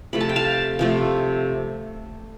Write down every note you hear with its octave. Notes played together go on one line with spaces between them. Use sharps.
C3 F3 A3 B5
A5
G5
F5 A5
C3 F3 A3